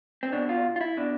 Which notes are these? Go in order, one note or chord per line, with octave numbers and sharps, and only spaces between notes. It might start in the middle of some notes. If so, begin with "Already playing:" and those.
C4
B2 D4
F4
F4
E4
B2 D4